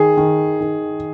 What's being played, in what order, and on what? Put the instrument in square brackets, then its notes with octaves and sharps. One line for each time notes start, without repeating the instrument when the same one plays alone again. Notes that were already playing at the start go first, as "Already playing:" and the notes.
Already playing: [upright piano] D#3 G#4
D#3
D#3